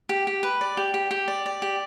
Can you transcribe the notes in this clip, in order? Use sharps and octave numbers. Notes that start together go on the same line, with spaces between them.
G4
G4
B4
D5
G4
G4
G4
D5
D5
G4